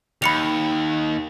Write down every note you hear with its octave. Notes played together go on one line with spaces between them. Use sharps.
D#2 B5 C#7 F7